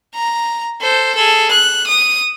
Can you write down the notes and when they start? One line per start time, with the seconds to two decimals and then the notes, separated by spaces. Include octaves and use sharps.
0.14 A#5
0.81 A4 C5
1.15 G#4 A4
1.51 F#6
1.87 D#6